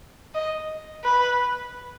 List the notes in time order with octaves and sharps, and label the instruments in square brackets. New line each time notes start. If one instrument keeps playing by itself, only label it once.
[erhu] D#5
B4